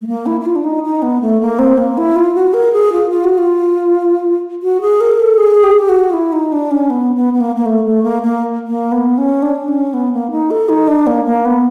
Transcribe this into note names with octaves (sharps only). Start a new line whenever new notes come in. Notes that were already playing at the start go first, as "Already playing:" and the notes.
A3
A#3
E4
E4
F4
D4
D#4
D#4
B3
A3
A#3
C4
A#3
E4
F4
F#4
A#4
G#4
F4
F4
F#4
F4
F#4
G#4
A#4
A4
G#4
G4
G#4
G4
F#4
F4
E4
D#4
D4
C#4
B3
B3
B3
A#3
A#3
A3
A3
A#3
A#3
A#3
B3
C#4
D4
C#4
B3
A#3
D#4
A4
D#4
D4
A#3
A#3
B3